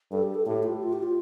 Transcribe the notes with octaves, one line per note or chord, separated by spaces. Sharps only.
G2 A4
G4
A4
A2 G4
F4
G4
F4
G4
F4